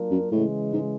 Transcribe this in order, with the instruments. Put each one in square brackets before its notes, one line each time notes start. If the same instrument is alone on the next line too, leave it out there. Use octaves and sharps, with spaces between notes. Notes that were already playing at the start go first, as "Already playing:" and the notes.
Already playing: [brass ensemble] F#3 A#3 D4 F4 A#4
[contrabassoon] F#2
[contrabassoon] A2 [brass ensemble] C#3 E3 G#3
[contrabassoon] G#2